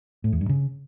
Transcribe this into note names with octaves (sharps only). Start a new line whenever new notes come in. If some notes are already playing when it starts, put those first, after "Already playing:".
A2
E2
G2
C#3